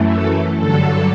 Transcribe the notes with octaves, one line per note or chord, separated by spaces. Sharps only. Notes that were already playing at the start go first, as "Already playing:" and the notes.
Already playing: F#2 E3 A3
A4
G2 D3 F#3 A4